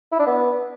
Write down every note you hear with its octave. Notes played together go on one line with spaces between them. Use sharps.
E4
D4
B3